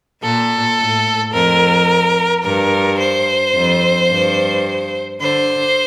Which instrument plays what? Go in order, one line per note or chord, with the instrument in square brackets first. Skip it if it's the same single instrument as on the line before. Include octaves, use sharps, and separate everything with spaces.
[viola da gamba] A#2 [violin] A4
[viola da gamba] A2
[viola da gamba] F2 [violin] A#4
[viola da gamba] G2 [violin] A#4
[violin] C5
[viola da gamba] F2
G2
[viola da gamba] D3 [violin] C5